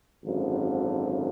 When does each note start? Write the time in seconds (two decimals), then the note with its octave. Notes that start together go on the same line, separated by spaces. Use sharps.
0.24 G#1 F#2 D3 F3